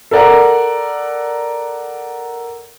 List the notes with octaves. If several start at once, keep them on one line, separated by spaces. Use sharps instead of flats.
A4 A#4 D5 F#5 A#5